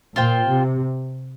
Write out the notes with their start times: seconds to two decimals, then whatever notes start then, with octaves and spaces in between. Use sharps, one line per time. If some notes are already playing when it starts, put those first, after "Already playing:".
0.16 A#2 F4 C5 G5
0.49 C3